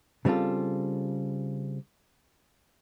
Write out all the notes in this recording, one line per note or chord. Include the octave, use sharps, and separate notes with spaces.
C#3 G3 C4 F4 A4